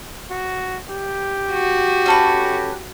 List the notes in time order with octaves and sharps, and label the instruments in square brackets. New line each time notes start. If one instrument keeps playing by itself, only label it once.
[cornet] F#4
G4
[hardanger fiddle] F#4
[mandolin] C#4 A4 B4